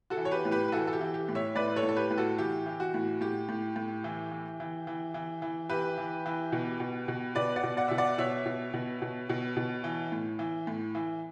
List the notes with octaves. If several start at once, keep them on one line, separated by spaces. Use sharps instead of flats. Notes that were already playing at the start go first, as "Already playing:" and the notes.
F#4 A4
E3
C#5
G4 B4
A2
G4 B4
B4
E3 F#4 A4
A4
G4
E3
G4
A2
C#5 E5
A2 B4 D5
A4 C#5
A2
A4
G4 B4
A2
F#4 A4
E3 G4
E3
F#4
A2
A2 G4
A2
A2
E3
E3
E3
E3
E3
E3
E3 G4 B4
E3
E3
B2
B2
B2
B2 B4 D5
D5 F#5
B2
D5 F#5
B2 E5
D5 F#5
B2 C#5 E5
B2
B2
B2
B2
B2
E3
A2
E3
A2
E3